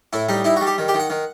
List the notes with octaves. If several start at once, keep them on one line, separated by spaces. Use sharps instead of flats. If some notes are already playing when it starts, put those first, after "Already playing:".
A2 E4
G3 D#4
D#4 E4
F#4
G3
G4
D#3
G4
D#3
F#5
D#3